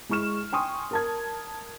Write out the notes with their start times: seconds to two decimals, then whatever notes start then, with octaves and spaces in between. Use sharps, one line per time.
0.09 G#3 E4 C#6 F6 E7
0.53 G5 G#5 C6 C#6 D#6
0.91 A#4 A5 G#6